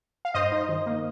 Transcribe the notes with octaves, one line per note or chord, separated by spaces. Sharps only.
F5
G2 C5 D#5
D#4
D#3
A#3